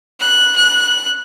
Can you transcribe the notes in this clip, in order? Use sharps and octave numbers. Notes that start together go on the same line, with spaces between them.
F#6
F#6